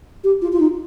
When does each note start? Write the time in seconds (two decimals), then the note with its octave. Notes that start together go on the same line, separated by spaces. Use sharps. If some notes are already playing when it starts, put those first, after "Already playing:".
0.24 G4
0.42 F4
0.53 F4
0.60 D#4